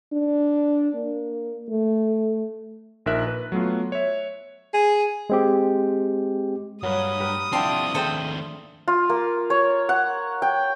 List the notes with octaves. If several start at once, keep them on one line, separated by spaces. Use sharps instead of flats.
D4
A#3
A3
A#1 D#4 A#4 E5 F#6
B4
F#3 A3 B3 F4
C#5 E5
G#4
G#3 C4 G4
G2 F#3 A#3 B4 D#6
G4 A#4 B4
D3 F3 C4 E4 G4 E5 A5 C6
D#2 A3 C4 G#4 A4 C5 G5
F4
A#3
C#5
F#5
G5